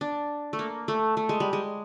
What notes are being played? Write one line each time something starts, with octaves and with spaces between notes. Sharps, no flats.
D4
A3
A#3
A3
A3
G#3
G3
G#3